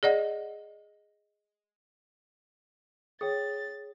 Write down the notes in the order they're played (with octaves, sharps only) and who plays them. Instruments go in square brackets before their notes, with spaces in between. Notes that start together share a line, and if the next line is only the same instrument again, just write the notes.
[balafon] G#4 D5 D#5 F#5
[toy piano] G#4 [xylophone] C#5 G5 D#6 [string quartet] A6